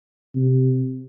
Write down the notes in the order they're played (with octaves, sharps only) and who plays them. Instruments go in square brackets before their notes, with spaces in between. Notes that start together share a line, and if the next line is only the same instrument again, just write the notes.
[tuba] C3